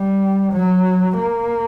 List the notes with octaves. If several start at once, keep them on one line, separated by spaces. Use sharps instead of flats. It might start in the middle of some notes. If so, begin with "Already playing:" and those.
Already playing: G3
F#3
A#3